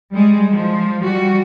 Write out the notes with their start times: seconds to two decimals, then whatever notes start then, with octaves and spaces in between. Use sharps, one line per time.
0.12 G3 G#3
0.50 F3
1.02 G3 F#4